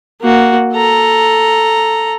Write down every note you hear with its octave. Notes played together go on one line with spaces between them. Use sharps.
A#3 F#4
A4 A#5